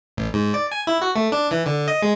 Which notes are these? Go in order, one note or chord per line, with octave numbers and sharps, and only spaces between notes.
A1
G#2
D5
G#5
E4
F#4
A3
D4
E3
D3
D#5
G#3